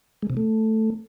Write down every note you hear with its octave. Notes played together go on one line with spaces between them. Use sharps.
G#3
C3
A3